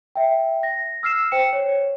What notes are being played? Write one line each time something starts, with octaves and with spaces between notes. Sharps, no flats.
E5 G5
A#6
E6 F6 C7 E7
C5 G5 C#7 E7
C#5